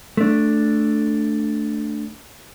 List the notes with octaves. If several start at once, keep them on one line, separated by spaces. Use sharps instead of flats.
A3 D4